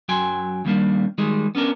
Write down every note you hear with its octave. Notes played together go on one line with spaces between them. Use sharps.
F#2 F#3 G5 G#5 C6
D#2 G3 A#3 D4
D#3 G3 G#3 G#4
B3 C#4 D4 A#4